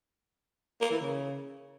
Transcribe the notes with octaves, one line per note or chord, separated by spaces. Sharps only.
A#3
E3
C#3